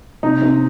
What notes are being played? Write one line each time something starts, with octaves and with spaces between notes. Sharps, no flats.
C3 D#4
C3